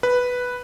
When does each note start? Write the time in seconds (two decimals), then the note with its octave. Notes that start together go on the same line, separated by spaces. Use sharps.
0.03 B4